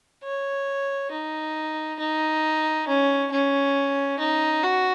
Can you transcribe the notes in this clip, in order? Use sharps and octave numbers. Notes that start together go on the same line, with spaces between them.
C#5
D#4
D#4
C#4
C#4
D#4
F#4